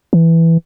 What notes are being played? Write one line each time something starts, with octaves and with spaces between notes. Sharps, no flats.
E3